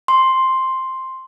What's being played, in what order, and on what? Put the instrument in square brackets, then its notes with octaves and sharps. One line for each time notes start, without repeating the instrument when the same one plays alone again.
[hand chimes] C6